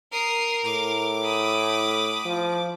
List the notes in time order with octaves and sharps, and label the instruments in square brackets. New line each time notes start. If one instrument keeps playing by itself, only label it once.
[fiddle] A#4 [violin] D#6 C7
[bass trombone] A2 [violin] D6
[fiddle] B5 D#6
[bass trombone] F3